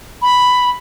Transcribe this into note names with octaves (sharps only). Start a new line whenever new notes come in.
B5